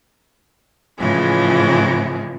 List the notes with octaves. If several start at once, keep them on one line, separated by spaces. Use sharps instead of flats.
A2 C#3 E3 F3 G#3